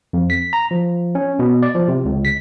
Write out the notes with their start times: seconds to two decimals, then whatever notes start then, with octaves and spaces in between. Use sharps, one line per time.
0.13 F2
0.30 B6
0.53 A#5
0.71 F3
1.15 C#4
1.39 B2
1.63 D5
1.75 F3
1.88 C3
2.05 C#2
2.25 B6